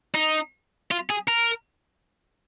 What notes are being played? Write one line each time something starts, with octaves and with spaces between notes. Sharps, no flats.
D#4
F4
G#4
A#4